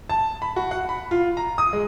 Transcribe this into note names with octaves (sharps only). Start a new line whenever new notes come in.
A5
B5
F#4
F#5
B5
F4
A#5
D#6
G#3